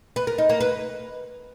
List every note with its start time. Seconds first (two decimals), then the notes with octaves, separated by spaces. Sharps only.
0.16 B4
0.27 A#4
0.38 D#4
0.49 A#3
0.61 B4